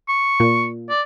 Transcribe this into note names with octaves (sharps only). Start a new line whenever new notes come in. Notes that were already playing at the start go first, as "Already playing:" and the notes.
C#6
A#2
D5